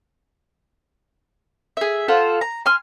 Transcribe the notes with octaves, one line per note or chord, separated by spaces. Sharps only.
G#4 E5
F4 A4 C5 F#5
A#5
G#5 C6 F6